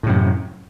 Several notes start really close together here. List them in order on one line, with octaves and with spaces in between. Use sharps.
A2 C3 F#2